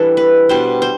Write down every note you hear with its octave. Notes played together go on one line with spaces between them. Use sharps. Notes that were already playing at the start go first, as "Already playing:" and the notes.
Already playing: E3 G3 D4 A4
B4
B2 G3 D4 C5
C5